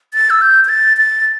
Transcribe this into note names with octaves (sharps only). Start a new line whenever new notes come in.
A6
E6
G6
G6
A6
A6